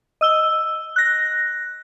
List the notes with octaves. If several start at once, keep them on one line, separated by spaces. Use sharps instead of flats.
D#5 E6 G7
F#6 A#6